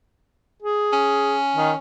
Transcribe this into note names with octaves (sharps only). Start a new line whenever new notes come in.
G#4
C#4
D#3